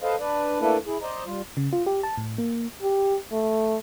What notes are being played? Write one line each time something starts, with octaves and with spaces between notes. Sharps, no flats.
A4 B4 C5 D#5 F5
D4 B4 D5
A3 A#3 D4 E4 A4 B4
E4 G#4
C5 D5 D#5 A#5
G3 F4
C#3
F4
G4
A5
A2
A#3
G4
A3